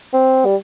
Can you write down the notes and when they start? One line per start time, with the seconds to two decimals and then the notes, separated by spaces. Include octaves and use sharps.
0.13 C4
0.45 G3